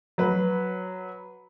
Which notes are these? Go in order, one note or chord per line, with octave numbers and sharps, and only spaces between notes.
F#3 B4